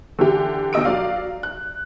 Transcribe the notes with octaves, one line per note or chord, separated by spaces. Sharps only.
D3 E3 G4
D2 B2 D#5 E6 D7
F#3 D5 F5
F#6